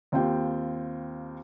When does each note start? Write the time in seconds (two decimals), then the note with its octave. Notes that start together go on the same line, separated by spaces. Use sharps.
0.12 D#2 C4 F4 G5